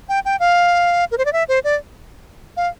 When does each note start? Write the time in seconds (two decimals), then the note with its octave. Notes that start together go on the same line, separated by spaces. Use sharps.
0.09 G5
0.25 G5
0.40 F5
1.11 A#4
1.18 C5
1.25 D5
1.33 E5
1.48 C5
1.64 D5
2.57 F5